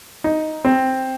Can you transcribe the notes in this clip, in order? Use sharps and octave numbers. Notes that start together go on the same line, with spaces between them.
D#4
C4